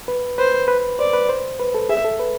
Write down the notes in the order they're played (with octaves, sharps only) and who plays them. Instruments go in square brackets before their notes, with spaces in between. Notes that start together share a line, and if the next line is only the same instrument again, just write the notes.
[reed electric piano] B4
[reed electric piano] B4 [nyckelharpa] C5
[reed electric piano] B4
[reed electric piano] C5 [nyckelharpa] D5
[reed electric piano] B4
C5
B4
A4
[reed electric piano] G#4 [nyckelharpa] E5
[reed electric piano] A4
B4